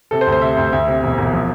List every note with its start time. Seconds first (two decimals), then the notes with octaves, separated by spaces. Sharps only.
0.11 C3 A4
0.21 C5
0.27 D2
0.32 C5
0.42 C3 E5
0.57 D2
0.73 D2 E5
0.88 C3
1.03 E1
1.18 E1
1.33 F3